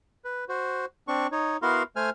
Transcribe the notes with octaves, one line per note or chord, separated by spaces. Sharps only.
B4
F#4 C5
C4 D4 C#6
D#4 C#5
B3 E4 F#4 A#4 F5 C6
A3 C5 G#5 F6